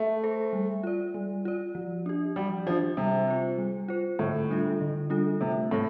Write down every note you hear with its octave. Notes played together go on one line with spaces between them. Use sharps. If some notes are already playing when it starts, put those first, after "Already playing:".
Already playing: A3
A4 C5
G3
F4 D5
G3
F4 D5
F3
D4 G4
F3 G3
F3 D4 G4
C3 G3
F4 C5
G3
F4 C5
A2 D3
G3 D4 F4 A4
D3
G3 D4 F4 A4
C3 A3
A2 C4 A4